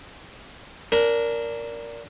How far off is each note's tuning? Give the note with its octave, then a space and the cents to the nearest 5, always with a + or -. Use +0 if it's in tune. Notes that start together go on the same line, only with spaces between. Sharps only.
D4 -20 A#4 +0